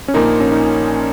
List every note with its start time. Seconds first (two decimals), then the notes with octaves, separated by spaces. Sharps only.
0.08 C#4
0.14 A#1 A#2 A#3 D#4
0.40 C#4
0.52 D#4